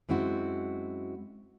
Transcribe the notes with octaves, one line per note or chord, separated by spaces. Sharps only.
F#2 G#3 C4 E4 F#4